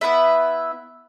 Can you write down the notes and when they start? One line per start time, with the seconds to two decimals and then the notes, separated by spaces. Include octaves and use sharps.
0.01 B3 E4 B4 E5